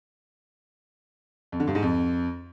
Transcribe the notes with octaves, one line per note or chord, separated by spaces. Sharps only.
F2
D3
G2
G#2
F2